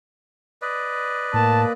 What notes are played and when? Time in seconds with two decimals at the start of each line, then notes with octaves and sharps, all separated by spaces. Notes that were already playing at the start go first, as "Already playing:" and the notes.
0.62 B4 D5 D#5
1.34 A2 A#3 A5